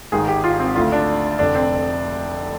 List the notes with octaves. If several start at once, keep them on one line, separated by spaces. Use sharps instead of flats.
G#1 G#2 D#3 G#4
G4
F4
C4
D2 D3 F4
D4
F1 F2 D3 D4
C4